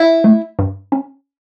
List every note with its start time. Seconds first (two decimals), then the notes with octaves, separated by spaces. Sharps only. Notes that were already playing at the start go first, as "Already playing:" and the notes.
Already playing: E4
0.24 A3
0.59 G2
0.92 C#4